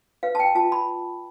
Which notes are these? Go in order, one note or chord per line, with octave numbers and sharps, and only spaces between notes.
B4 F5
A5
G5
F4 A5
B5